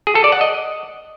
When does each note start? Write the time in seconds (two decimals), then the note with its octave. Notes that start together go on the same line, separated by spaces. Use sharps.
0.07 G#4
0.15 A4
0.24 D5
0.32 F#5
0.41 D#5